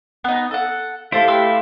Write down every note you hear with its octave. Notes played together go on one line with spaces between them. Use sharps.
B3 D#4
A4 F#5
A3 E4 G4 A4 C5 F5
B4 C6 E6